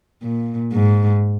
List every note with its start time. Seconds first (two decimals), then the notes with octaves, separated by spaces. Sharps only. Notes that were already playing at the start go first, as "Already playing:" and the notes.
0.23 A#2
0.73 G#2